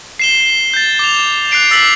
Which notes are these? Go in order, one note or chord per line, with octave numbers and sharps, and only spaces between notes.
C7 E7 G7
G6 A6
D6 F7
F#6 A6 C7 D7 F7
E6 A6 B6 C7 F#7